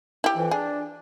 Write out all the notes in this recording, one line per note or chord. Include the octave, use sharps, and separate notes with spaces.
E4 G4
F2 E3
D4 G#4